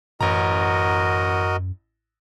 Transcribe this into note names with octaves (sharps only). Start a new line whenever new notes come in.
A1 F#2 F#4 A#4 D#5 A#5